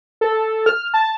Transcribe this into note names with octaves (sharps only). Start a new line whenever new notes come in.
A4
F6
A5